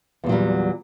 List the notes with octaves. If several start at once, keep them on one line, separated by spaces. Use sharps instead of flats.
E2 A#2 F#3 G3